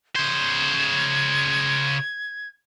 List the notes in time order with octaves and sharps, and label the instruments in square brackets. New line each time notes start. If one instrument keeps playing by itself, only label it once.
[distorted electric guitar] C#3 C5 [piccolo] G#6